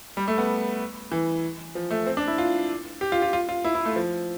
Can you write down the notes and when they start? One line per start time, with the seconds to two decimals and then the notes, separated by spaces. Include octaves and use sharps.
0.17 G3
0.28 A3
0.38 B3
1.12 E3
1.75 F3
1.91 A3
2.06 C4
2.17 D4
2.28 E4
2.38 F4
3.01 G4
3.12 F4
3.22 F4
3.33 F4
3.49 F4
3.65 E4
3.75 E4
3.85 A3
3.96 F3